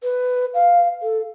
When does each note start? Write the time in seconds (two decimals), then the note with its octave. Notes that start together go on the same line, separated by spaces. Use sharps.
0.03 B4
0.54 F5
1.02 A4